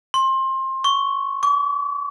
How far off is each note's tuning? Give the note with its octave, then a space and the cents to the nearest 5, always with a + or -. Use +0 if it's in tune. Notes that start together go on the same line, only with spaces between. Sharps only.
C6 +25
C#6 +5
D6 -45